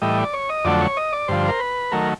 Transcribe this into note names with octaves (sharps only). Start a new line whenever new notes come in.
A2 E3 G3 D#5
D5
C#5
D#5
F2 D3 F#3 A3 D5
C#5
D#5
D5
G2 D3 F3 C5
A#4
B4
D#3 F#3 A3 A#4